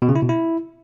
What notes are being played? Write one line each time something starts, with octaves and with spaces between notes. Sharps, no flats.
B2
C#3
E4
B2
E4